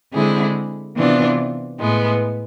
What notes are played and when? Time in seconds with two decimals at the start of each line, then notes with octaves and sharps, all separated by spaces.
0.13 D3 G#3 C4 E4 G#4
0.96 C3 E3 B3 D4 F4
1.78 A2 E3 G#3 B3